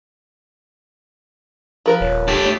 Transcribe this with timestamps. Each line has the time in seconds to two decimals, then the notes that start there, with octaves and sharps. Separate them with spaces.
1.86 F3 A#4 B4
2.01 D#1 C#5
2.28 G4 A4
2.46 A3